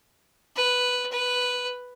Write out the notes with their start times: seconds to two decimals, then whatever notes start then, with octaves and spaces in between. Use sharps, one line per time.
0.56 B4
1.12 B4